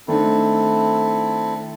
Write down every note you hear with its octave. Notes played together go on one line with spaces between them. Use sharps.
D#3 A3 C4 D4 E4 A4